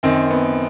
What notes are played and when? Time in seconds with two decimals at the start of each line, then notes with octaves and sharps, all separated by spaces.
0.03 F#2 D#3 C4
0.30 B3